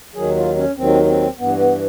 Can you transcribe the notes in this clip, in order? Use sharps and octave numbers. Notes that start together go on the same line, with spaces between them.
D#2 D#3 F#3 G#4
F4
C#4
D#2 D#3 F#3 C4
C4
G2 E3 B3
B3